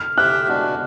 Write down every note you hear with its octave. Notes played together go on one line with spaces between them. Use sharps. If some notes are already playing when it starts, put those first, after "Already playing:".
Already playing: F6
G4 C5 E5 G5 F#6
G#3 B3 D4 F#4